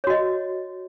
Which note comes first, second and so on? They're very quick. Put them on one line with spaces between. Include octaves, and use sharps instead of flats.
C#5 F#4 D#5